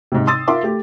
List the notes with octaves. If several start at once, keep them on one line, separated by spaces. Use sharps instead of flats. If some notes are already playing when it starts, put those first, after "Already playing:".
G#2 C3
C6 D#6 E6 A6
F4 A#4 E5 C6 D6
A3 G4